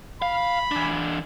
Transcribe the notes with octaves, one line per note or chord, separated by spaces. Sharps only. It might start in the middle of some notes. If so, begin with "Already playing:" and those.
F5 B5
E3 D4